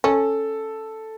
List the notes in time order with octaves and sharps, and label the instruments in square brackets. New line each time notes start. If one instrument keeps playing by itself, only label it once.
[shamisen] C#4 [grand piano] A4